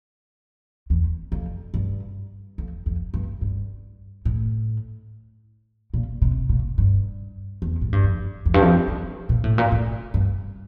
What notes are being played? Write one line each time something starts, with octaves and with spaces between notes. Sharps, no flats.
E2
F2
G2
F2
F2
G2
G2
A2
A#2
C3
A#2
G2
E2
A2
G2
F2
F2
G2
F2
E2
A#2
A2
A#2
A2
G2